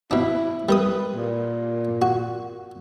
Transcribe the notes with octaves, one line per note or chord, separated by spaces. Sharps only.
B2 D4 E4
G3 A#4 B4 D#6
A#2
F#4